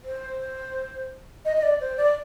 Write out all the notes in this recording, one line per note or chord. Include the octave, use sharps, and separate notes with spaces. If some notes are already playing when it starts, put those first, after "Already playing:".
C5
D#5
D#5
D5
C5
D5